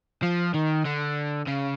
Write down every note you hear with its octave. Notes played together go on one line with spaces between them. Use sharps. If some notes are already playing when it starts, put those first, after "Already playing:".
F3
D#3
D3
C#3